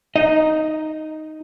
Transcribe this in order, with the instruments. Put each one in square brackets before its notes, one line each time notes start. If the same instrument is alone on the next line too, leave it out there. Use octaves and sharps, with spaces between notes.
[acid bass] D#4 [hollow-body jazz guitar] D#5